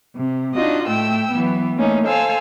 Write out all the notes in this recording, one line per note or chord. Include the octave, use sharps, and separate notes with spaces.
C3
D4 D#4 F4 F#4 D#5
A2 A3 G5 E6
E3 F#3 B3
A3 A#3 C#4 D#4
A4 C5 F5 G#5 E6